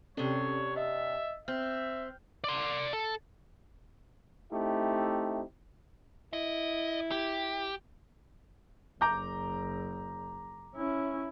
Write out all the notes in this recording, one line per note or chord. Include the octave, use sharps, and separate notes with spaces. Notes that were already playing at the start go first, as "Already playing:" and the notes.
C3 C#4 D4 A4 C#5 D5
D#5 E5
C4 E5 F6 G6
D5 C6
A4
A3 C4 D#4 E4 G4
E4 D#5
G4
F#1 A#5 D6 G6
C#4 E4